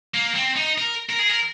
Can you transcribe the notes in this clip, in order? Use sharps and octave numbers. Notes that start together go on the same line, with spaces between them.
A#3
C4
D#4
A#4
A#4
G#4
A#4